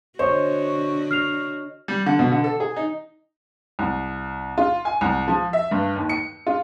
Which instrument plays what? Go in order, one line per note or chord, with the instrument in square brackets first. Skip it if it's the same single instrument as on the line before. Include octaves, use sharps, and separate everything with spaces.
[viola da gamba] D3 F#4 [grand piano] C5 [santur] C#5 D#5
[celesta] F6 C7 F7
[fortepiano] G3
D3
B2
D3
A4
G#4
D#4
[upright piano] C2
F4
G#5
C2
F3
E5
G2
D#2
C#7
F4